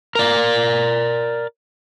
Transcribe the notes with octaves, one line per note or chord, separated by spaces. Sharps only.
A#4 D5